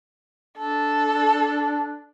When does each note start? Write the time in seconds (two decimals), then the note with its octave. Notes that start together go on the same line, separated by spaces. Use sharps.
0.58 D4 A4